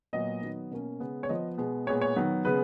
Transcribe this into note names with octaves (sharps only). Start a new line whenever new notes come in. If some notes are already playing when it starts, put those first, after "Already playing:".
A#2 F#3 B3 D#5
D#3 F#3 B3
B2 A#3 C#4
C#3 G#3 B3
C#5
F3 B3 D#5
B2 G#3 B3
A#2 G#3 B3 C#5
C#5
D#3 F#3 B3
C#3 G#3 B3 B4